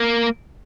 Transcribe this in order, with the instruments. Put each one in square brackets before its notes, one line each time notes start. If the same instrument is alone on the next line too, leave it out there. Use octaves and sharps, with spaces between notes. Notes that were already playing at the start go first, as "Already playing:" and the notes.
Already playing: [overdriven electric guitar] A#3